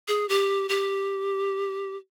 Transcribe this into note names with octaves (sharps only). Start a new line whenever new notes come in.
G#4
G4
G4